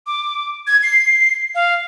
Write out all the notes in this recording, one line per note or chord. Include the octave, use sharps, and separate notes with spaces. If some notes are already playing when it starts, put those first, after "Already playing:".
D6
G#6
C7
F5